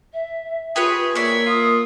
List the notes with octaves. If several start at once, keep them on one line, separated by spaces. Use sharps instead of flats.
E5
F4 G4 G#4 B4 C#5
A#3 C#5 D5 E5
F4 D#6